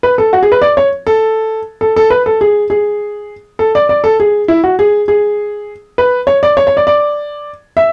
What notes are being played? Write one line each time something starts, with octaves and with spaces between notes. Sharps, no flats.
B4
A4
F#4
G#4
B4
D5
C#5
A4
A4
A4
B4
A4
G#4
G#4
A4
D5
D5
A4
G#4
E4
F#4
G#4
G#4
B4
C#5
D5
C#5
C#5
D5
D5
E5